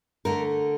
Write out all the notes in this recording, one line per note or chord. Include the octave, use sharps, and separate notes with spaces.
D3 A3 A#4